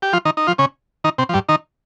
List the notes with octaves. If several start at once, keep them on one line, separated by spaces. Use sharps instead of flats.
G4
F3 F4
D#3 D#4
D#4
F3 F4
C#3 C#4
D#3 D#4
C3 C4
F3
G2 G3
D#3 D#4